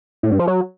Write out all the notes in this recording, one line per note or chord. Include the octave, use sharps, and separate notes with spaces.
A2
G2
F3
F#3